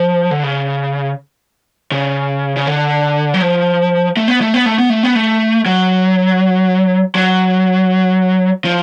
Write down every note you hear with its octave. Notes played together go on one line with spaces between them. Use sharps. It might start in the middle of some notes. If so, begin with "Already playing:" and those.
Already playing: F3
D3
C#3
C#3
C#3
D3
F#3
F3
A3
B3
A3
B3
A3
B3
A3
B3
A3
F#3
F#3
F3